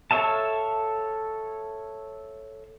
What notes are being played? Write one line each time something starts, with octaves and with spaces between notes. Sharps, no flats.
A4 C#5 E5 F5 A5